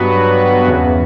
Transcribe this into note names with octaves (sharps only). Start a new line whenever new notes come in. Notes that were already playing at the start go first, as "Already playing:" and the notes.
Already playing: G2 F#3 B3 F#4 B4
E2 C#3 E3